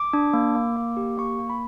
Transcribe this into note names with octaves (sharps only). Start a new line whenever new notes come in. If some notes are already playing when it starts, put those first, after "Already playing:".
Already playing: D6
D4
A#3
A#3
A#3
G4
A#3 C#6
A#3
B5